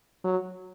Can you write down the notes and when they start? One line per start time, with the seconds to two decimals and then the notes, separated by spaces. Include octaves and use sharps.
0.24 F#3